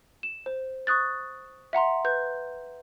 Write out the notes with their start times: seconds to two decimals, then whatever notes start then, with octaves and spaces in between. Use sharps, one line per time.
0.23 E7
0.46 C5
0.87 C#6 D#6 F#6 A6
1.73 E5 F#5 A#5 C6
2.05 B4 G6